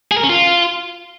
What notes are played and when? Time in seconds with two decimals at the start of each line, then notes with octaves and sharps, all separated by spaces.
0.12 G#4
0.17 A#4
0.23 C#4
0.29 F4